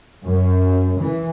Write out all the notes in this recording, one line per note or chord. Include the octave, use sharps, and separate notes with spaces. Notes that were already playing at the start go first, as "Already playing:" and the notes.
F#2
E3